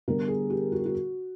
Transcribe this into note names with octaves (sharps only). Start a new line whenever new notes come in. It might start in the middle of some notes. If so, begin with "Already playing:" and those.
D3 G3 B3 A#4
G#4
G4
F#4
G4
F#4